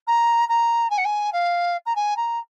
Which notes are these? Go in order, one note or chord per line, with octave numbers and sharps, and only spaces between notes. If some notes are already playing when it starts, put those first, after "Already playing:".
A#5
A#5
G#5
F#5
G#5
F5
A#5
G#5
A#5